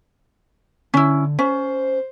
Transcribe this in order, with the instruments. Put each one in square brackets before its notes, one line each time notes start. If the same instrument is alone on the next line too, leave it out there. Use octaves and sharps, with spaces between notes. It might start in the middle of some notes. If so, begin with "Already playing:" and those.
[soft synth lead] D3 [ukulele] C#4 E4
[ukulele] C#4 [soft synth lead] C5